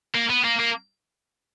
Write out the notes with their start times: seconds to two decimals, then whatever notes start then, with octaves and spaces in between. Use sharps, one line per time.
0.15 A#3
0.30 B3
0.45 A#3
0.60 A#3